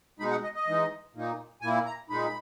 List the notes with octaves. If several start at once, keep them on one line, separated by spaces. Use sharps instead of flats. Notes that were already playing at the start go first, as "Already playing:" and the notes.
B2 G#3 D#4 B5
F#5
D#5
D#5
E3 G#3 D#4
A#2 A#3 D#4
A#2 A#3 E4 G#5
A#5
A#2 G#3 D#4 B5